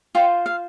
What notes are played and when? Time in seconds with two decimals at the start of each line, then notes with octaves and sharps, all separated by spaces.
0.15 F4 C5 G5
0.46 F5